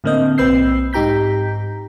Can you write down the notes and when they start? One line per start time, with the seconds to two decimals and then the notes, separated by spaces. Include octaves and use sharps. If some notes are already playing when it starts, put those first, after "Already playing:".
0.04 A2 D3 A#3 C4 D#5 G6
0.38 B1 C4 B4 E6 G6 C7
0.93 G#2 D#4 G4 A#5 G6 B6